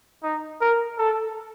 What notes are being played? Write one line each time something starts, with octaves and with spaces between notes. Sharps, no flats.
D#4
A#4
A4